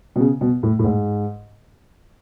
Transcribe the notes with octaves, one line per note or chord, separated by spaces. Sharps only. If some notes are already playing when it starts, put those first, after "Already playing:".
B2
C#3
B2
A2
A2
G#2